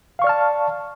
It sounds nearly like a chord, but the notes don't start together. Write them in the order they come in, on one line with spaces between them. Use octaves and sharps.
F5 C#6 D5 F6 A5